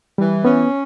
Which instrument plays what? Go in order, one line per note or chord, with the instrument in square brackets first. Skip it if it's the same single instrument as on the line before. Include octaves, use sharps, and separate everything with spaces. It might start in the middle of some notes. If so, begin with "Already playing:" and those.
[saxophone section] E3 [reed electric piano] G3
[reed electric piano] B3 [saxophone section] C#4